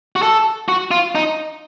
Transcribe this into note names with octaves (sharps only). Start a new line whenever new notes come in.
F#4
A4
F#4
F4
D#4